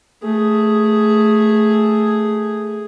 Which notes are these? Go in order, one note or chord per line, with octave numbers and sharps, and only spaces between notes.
A3 G#4